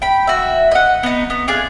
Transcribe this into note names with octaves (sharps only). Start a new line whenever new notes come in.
G5 B5
F#4 E5
D#5 F#5
B3 D#4
B3
D4 F4 G#4